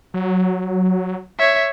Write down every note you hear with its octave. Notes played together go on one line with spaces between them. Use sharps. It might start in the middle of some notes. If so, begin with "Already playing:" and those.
F#3
C#5 E5